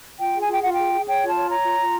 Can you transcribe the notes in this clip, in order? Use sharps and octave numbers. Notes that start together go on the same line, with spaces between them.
F4 G5
G#4
G#5
F4 G5
F4 F#5
G#4 G5
G#4
C#5 G5
F4
A5
C#5
C#5 A#5
F4
F4